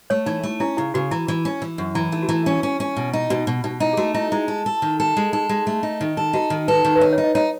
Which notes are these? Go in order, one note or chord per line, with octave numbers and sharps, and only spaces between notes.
A3 C#5
E3 D#4
A3
C#4 E4
C#3 E4
C#3 F#4
E3 E4
E3
C#4
E3
F#2
E3 E4
A3 D#4
F#4
E3 E4
C#4
C#4
C#4
B2
D#4
B2 F#4
B2
B2 D#4
D#4 E4
G#4
A3 F#4
D#4 E4
G#3 E4
A4
A4
D#3
A4
G#3
D#4 A4
G#3
A3
D#4
D#3
A4
D#4 F#4
D#3
A4 B4
D#3
B4
D#4 C#5
C#5
D#4
D#5
D#4 C#5